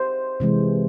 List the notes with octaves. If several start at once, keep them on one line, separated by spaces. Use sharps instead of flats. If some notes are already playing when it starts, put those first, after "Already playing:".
Already playing: C5
C3 E3 G#3